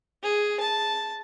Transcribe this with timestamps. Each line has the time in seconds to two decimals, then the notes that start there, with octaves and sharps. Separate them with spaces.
0.23 G#4
0.60 A5